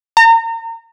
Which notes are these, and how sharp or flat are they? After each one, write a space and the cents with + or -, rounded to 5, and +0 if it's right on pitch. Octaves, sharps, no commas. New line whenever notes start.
A#5 -35